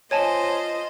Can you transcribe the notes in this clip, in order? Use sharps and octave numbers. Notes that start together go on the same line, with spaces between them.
F4 C5 C#5 D#5 G#5 A5